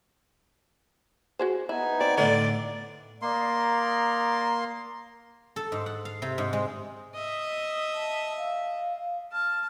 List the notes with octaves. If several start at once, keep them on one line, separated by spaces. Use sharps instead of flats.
F#4 G#4 C5
B3 D#4 E4 G#5
C4 D5
A2 D3 D#3 D5
A#3 D5 D#5 A#5 C6
A4
G#2
F#5
F5
C3
G#2
G#3
D#5 E5
A5
F5
A5 F6